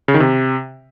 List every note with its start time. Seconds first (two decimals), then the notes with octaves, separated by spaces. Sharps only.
0.08 C#3
0.14 D#3
0.20 C3